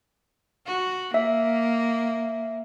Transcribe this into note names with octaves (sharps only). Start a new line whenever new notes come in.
F#4
A#3 E5